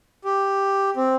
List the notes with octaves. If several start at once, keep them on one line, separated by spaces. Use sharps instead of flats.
G4
C4